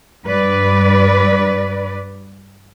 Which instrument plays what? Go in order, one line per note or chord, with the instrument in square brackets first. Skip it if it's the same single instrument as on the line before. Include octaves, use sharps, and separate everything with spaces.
[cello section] G2 B4 D5